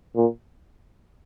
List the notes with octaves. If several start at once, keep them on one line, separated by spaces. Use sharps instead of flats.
A#2